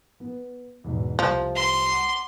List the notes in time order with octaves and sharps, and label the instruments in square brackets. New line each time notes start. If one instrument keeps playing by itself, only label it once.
[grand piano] B3
E2 G#2 B2
[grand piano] C2 [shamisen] F3
[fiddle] C6
[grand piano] F#5 D6